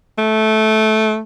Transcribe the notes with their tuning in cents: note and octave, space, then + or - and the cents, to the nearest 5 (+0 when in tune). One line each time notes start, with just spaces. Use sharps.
A3 -15